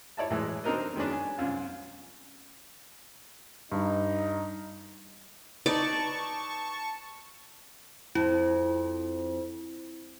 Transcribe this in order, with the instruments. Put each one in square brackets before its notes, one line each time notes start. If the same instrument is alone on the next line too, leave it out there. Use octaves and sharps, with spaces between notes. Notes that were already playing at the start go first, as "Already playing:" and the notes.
[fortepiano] E4 C#5 D5 E5 A5
A2 E3 G#3
C4 D4 D#4 A#4 B4 D#5
D#3 G#3 B3 C#4 D4
G#5
C2 F#2 F4
[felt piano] G2 [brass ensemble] D#4
[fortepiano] D#4 B4 [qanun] D5 [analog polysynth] A5 C#6
[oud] F2 [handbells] E4